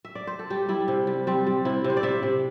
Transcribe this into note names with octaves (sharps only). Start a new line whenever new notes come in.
E5
D5
C5
A4
G3 G4
G3 E4
C3
G3
G3 C4
G3
C3 E4
C3
C5
D5
C3 E5
C3